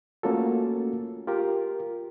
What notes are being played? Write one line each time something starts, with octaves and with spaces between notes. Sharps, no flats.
A3 A#3 C#4 F4 F#4 A4
F4 G4 A#4